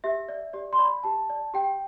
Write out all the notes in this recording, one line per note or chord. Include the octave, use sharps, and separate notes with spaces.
G4 E5
D5
G4 D5
C6
D5 B5
G4 A5
D5
G4 G5